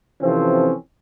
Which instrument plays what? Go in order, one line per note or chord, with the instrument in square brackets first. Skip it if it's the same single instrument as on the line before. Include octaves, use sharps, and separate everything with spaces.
[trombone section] C3 E3 F3 C4 C#4 A4